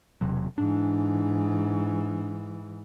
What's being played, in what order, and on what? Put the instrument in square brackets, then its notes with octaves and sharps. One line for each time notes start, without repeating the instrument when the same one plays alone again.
[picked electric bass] E1 C3 F#3
[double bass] G#2 E3 [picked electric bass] D4